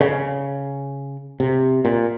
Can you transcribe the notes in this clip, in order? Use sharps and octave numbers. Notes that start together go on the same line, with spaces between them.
C#3
C3
A#2